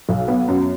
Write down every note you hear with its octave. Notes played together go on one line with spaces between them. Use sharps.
B1
B3
F#2